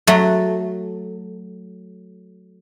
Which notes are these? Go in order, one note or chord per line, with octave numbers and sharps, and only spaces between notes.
F#3 A3